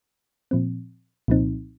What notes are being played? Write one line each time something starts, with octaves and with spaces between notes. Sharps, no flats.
A#2 F3 C4
C2 A#2 F3 C4 D#4